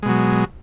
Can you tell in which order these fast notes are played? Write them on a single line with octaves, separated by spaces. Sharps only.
G#3 B2 F#3